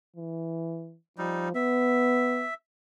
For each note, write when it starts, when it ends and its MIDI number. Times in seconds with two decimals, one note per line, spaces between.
0.16 0.97 52
1.18 1.51 53
1.18 1.49 55
1.18 1.49 63
1.55 2.46 59
1.55 2.54 76